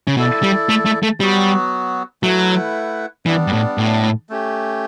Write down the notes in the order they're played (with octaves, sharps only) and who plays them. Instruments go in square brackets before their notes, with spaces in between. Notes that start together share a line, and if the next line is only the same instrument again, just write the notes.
[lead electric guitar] C#3
[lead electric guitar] B2 [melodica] E4 A4 D5
[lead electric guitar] G3
A3
A3
A3
[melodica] F#3 B3 F#4 [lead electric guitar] G3
[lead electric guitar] F#3 [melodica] A3 E4 B4 F#5
[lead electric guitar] E3 [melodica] G3 B3 D4
[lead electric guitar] G2
A2
A2
[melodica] A3 C#4 G4